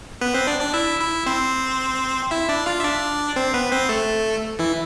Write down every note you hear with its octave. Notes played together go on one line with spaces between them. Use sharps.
B3 B4
C4 C5
D4 D5
D4 D5
E4 E5
E4 E5
C4 C5
E4 E5
D4 D5
F4 F5
E5
D4 D5
C4 C5
B3 B4
C4 C5
A3 A4
E3 E4